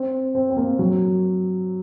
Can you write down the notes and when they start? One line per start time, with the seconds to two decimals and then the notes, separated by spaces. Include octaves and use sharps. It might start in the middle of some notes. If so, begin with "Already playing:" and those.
Already playing: C4
0.35 C4
0.50 C4
0.57 A#3
0.79 F#3